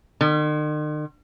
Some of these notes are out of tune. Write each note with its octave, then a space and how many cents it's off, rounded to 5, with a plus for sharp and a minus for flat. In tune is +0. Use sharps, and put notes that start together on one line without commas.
D#3 -45